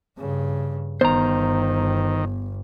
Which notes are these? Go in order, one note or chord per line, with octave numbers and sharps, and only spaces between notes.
G2 C#3
G1 D#3 B3 C5 A#5